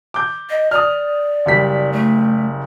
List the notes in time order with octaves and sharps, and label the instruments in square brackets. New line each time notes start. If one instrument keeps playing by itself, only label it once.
[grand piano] D6 G6
[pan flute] D#5
[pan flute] D5 [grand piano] D#6 F6
[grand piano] F#1 G3 B6
[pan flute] A3